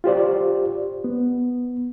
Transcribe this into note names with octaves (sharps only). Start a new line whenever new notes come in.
F4 G4 C5 D5
B3